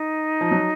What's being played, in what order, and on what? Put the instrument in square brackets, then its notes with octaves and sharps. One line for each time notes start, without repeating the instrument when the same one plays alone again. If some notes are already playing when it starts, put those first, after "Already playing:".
Already playing: [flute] D#4
[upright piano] F3
F#3